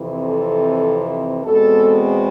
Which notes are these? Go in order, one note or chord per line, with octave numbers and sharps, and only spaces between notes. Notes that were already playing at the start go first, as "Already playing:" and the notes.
Already playing: F2 C3 E3
A4
E2 B2 G#3 C4 A4